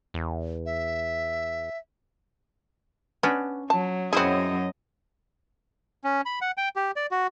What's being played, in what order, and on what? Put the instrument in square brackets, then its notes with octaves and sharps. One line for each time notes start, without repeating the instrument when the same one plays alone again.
[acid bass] E2
[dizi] E5
[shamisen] B3 [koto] C#4 D4
[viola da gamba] F#3 [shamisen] A5
[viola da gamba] F#2 F#3 D#5 [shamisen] C4 G#4 [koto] E4 C5 F#5
[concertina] C#4
B5
F#5
G5
G4
D5
F#4